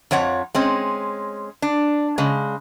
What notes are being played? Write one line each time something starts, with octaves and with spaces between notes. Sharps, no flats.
F2 F3 C#5 F#5
G#3 C4 C#4
D4
C#3 G#3